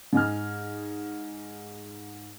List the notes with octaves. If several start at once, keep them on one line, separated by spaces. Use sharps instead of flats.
G#2 D#5 G#5 F6